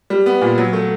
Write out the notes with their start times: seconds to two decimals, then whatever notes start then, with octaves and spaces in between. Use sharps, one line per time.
0.10 G3
0.26 B3
0.41 A#2
0.58 F#3
0.73 A3